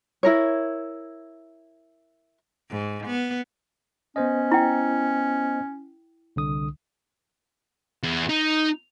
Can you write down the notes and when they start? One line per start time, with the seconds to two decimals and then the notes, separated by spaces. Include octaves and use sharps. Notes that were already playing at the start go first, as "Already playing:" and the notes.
0.23 E4 A#4 C#5
2.70 G#2
3.07 B3
4.16 B3 C#4 C5 D#5
4.52 E4 G5
6.36 C2 D3 D#6
8.04 E2
8.30 D#4